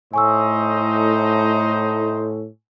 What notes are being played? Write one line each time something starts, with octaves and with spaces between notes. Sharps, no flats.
A2 D#4 C5 D#5 G#5 C#6 E6